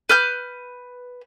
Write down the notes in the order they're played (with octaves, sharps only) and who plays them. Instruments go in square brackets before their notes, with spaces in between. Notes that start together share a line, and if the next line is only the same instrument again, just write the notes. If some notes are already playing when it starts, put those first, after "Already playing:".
[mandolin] B4 F6 G6